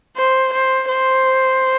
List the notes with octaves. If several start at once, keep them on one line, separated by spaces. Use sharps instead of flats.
C5
C5
C5